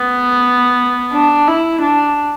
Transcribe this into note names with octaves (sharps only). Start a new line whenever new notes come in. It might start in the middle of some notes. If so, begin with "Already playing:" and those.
Already playing: B3
D4
E4
D4